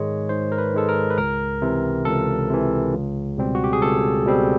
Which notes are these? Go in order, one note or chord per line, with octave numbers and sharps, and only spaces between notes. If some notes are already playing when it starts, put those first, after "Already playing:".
Already playing: G#2 D#3 G#3 C#5
G#2 C5
A#4
B4
D#3 G#3 A4
A#4
B4
C#2 A#4
C3 E3
C#2 A4
C3 E3
C#2
B2 G3 C4
F#4
G4
G#4
C#2 A4
B2 G3 C4